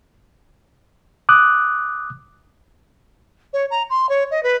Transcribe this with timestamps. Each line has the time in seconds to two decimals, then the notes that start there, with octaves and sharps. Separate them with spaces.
1.29 D6 D#6 F#6
3.53 C#5
3.70 A#5
3.90 C6
4.09 C#5
4.31 D#5
4.43 B4